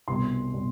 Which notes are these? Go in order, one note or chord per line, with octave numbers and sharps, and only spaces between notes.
C2 B2 G3 C6
B2 G3